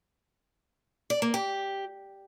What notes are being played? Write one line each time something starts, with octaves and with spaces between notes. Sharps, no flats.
D5
A#3
G4